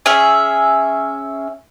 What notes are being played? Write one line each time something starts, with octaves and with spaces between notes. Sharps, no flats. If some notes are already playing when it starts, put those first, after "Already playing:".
C#4 G#4 E5